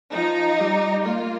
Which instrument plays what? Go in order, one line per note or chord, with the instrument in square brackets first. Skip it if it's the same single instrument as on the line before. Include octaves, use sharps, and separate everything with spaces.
[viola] F3 [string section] D#4
[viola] G3
[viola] A#3 [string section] F4